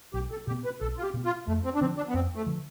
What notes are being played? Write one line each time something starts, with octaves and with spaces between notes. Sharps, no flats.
B1 G4
A4
B2 B3 G4
B4
B1 A4
F4
G4
B2 B3
F4
F2 A3
C4
D4
D3 F3 C4
D4
B3
F2 C4
A3
D3 F3